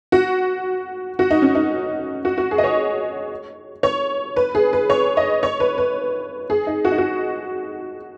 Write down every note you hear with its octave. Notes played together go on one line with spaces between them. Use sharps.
F#4
F#4
D#4
C#4
D#4
F#4
F#4
G#4
D#5
C#5
C#5
B4
G#4
B4
C#5
D#5
C#5
B4
B4
G#4
D#4
F#4
D#4
F#4